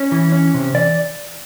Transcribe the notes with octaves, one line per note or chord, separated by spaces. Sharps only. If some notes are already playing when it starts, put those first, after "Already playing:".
Already playing: C#4
E3
C#4
C3
E3 D5